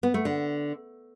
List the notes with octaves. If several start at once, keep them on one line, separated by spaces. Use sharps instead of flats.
B3
A3
D3